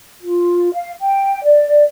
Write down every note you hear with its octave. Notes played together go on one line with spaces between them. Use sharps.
F4
F5
G5
D5